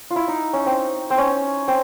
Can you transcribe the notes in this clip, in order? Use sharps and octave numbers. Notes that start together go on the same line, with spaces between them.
F4
E4
D#4
C#4
C4
C4
C#4
C4